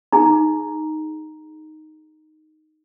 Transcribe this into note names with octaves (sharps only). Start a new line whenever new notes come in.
D#4 G#4 A#5